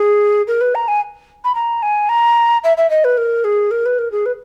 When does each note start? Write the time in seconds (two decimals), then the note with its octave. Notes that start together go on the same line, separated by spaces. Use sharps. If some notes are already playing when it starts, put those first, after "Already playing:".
Already playing: G#4
0.47 A#4
0.61 B4
0.75 A#5
0.88 G#5
1.44 B5
1.55 A#5
1.82 G#5
2.09 A#5
2.64 E5
2.77 E5
2.90 D#5
3.04 B4
3.17 A#4
3.44 G#4
3.71 A#4
3.86 B4
3.99 A#4
4.12 G#4
4.26 B4